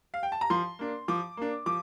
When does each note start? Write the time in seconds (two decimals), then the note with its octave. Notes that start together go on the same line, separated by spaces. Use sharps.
0.14 F5
0.23 G5
0.32 A5
0.41 A#5
0.50 F3 C6
0.79 A#3 D4
1.08 F3 D6
1.37 A#3 D4
1.66 F3 D6